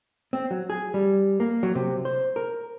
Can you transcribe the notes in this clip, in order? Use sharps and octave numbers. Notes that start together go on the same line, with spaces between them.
C4
F#3
G#4
G3
A#3
F#3
C3
C5
A#4